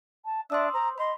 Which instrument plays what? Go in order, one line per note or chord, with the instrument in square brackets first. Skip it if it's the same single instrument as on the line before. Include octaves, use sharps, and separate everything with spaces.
[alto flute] A5
[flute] D4 [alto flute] E5 [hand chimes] C6 D#6 E6
[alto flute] C5 [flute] A#5
[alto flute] D#5 [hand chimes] B5 [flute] C6